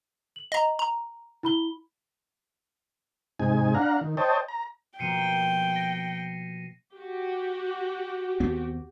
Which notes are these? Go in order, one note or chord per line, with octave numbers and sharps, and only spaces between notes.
F#7
D#5 A#5
A#5
E4 B5 G7
G#2 C3 D#4 G#5
D4 F5 F#5 A#5
D#3
C5 C#5 D#5 G5 A5
A#5
B2 F3 A#3 G5 C7 C#7 D#7
A#6
F#4 G4
D#2 B3 C4